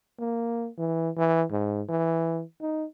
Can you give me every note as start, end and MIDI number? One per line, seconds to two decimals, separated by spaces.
0.19 0.68 58
0.78 1.10 52
1.17 1.44 52
1.51 1.82 44
1.89 2.42 52
2.61 2.85 63